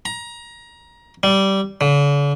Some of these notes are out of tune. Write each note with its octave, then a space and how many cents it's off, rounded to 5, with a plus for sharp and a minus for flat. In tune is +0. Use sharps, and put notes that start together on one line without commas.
A#5 +25
G3 -15
D3 -45